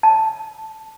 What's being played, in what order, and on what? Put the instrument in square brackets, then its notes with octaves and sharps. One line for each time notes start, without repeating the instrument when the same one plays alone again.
[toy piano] A5